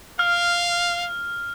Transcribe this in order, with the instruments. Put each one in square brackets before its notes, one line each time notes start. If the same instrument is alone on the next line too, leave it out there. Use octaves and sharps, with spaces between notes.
[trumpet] F5 [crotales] F6